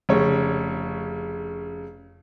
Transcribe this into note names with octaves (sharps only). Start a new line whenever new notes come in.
F1 C#3 C#5